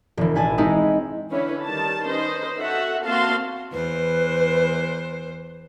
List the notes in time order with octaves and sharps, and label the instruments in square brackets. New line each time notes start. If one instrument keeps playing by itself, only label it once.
[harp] E1 E3
A1 E4 G#5 A5
G#3 C4 D#4 E4
[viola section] D3 E3 C#4 E4 B4 C#5
D#3 G3 A5
C#4 D#4 B4 C5 D#5
F#4 A4 E5 F#5
A#3 C4 F#4 F5 A5 C6
[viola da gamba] E2 C5 [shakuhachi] B4